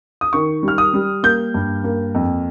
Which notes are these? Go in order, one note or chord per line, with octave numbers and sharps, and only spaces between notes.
D#6
D#3 C#6
G3 F6
D#6
G3
A#3 G6
G2
A#3
F2